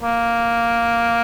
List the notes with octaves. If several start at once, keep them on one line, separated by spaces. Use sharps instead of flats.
A#3